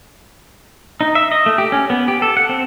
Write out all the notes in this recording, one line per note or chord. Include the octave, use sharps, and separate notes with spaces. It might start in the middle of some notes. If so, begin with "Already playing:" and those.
D#4
E5
D#5
A3
G4
C#4
B3
G4
A4
F#5
C4